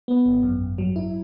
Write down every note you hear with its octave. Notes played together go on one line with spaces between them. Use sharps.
B3
G#1
F#2
G#1
F#3
E4